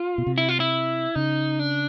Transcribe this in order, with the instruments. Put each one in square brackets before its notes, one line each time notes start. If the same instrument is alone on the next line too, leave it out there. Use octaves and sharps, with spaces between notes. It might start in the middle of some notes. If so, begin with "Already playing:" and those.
Already playing: [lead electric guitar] F4
[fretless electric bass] B2
C3
[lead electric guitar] E4
F4
E4
[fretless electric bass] C#3 [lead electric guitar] D#4
[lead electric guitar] D4